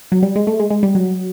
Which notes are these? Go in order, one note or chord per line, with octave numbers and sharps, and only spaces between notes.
F#3
G3
G#3
A3
G#3
G#3
G3
F#3